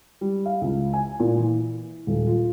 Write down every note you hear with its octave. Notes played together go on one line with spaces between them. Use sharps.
G3
F5
C#2
G#5
A#2
E3
D#1
F4